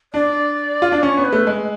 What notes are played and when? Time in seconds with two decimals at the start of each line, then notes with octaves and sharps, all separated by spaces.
0.14 D4 D5
0.82 F4
0.92 D4
1.03 C#4 C#5
1.17 B3
1.25 B4
1.33 A3
1.47 G#3